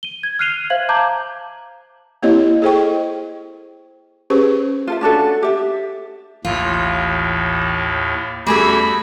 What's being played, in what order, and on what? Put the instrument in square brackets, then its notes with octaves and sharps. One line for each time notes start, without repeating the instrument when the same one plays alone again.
[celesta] D#7 G7
G#6
F6 F#6 C7 D#7 F7 G7
C5 E5 F5 G#6 F#7
A5 A#5 D6 G6 G#6
[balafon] A#3 C4 E4 G4 C#5 D#5
G#4 A4 C5 D#5 G5 C#6
C#4 G4 G#4 B4 C5 C#6
[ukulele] F4 A4 E5
C#4 D4 F#4 A4
G4 E5
[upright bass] A1 [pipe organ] D#2 A2 [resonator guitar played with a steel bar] F4
[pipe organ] E2 F#4 [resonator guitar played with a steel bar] G3 G#4 A4 [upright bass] A3 C#4 [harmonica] B5